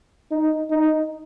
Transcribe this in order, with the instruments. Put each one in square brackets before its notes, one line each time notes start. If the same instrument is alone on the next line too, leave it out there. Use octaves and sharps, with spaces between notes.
[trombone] D#4
D#4